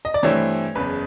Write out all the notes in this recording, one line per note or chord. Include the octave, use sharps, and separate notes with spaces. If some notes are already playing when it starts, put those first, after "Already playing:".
D#5
D5
G2 E3 A3 C4 C#5
F#1 E2 C#3 B4